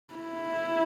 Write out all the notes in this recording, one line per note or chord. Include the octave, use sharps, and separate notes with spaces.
E4